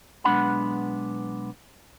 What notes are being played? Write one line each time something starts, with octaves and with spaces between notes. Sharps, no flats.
B1 G#3 B3 D4 F#5 B5